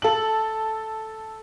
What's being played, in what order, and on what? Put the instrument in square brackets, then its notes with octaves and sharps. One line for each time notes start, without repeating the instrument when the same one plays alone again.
[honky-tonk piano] A4 F#7